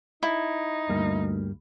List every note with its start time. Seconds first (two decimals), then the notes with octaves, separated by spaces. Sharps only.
0.23 D#4 E4
0.89 D2 G2 G3 A#3